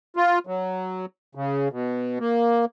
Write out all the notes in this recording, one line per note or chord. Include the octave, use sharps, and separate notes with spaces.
F4
F#3
C#3
B2
A#3